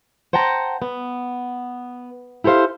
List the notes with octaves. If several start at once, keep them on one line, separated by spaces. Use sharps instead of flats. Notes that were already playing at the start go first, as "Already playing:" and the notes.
C5 F#5 G5 A5 A#5
B3
E4 G4 A4 C5 F5